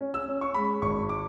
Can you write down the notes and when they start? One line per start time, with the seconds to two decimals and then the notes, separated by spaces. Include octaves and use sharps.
0.01 C#4
0.14 E6
0.28 C#4
0.41 C#6
0.54 G#3 B5
0.82 G#1 C#6
1.09 D6